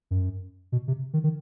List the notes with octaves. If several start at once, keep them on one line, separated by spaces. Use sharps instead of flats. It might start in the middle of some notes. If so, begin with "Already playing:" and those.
F#2
B2
C3
D#3
D#3